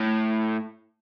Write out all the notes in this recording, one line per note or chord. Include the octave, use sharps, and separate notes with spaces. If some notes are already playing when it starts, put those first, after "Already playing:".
Already playing: A2